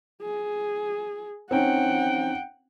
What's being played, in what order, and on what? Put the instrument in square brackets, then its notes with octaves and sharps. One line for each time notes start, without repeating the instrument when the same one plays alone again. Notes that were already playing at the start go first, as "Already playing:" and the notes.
[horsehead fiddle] G#4
[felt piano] C4 C#4 D#4 [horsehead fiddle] F#5 G5